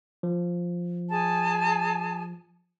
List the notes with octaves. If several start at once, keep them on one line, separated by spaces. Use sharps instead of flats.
F3
G#4 G#5 A5